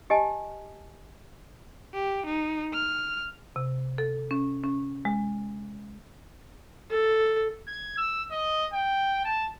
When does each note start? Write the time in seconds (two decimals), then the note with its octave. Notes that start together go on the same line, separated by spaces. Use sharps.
0.10 G4 D#5 G#5 A5
1.94 G4
2.26 D#4
2.73 F6
3.56 C3
3.98 A4
4.31 C#4
4.64 C#4
5.05 G#3
6.91 A4
7.68 G#6
7.97 E6
8.31 D#5
8.74 G5
9.25 A5